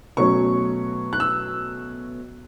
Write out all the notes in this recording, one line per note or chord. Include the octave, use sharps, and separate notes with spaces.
B2 F#3 A3 C#4 C#6
F#6
E6